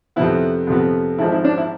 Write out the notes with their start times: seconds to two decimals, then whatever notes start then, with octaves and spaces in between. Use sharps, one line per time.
0.16 F2 C3 F3 B3 E4
0.67 F2 C3 F3 B3
1.18 G#1 G#2 F3 E4
1.32 E4
1.45 D4
1.58 E4